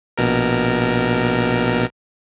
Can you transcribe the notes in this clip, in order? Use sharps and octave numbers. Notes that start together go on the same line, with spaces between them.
A#1 B2 A#4